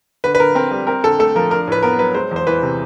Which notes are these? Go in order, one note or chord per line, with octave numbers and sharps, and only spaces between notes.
D3 B4
B4
D3 A#4
C4 A#4
G3
C4 A#4
D3 A4
A3 A4
F3 A#4
D4 A#4
A2 B4
B3 A#4
F#3 B4
G#3 C5
E2 C5
E3 B4
C3